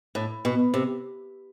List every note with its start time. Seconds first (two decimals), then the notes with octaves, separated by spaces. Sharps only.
0.15 A2
0.45 B2
0.74 C3